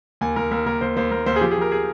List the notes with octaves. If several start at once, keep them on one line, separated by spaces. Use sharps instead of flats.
D#2 G#5
D#2 A#4
D#2 A#4
D#2 A#4
D#2 C5
D#2 C5
D#2 A#4
D#2 C5
G#4
F3 G4
G#4
F3 A#4
G#4